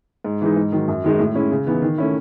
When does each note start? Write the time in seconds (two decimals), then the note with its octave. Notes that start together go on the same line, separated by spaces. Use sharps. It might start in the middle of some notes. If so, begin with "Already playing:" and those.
0.24 G#2
0.41 E3 G#3 D#4
0.56 G#2
0.72 D#3 F#3
0.88 F#2
1.04 D#3 G#3 D#4
1.19 A2
1.35 G#3 C#4 E4
1.51 C#3
1.66 E3 B3 D#4
1.82 D#3
1.98 A3 C#4 E4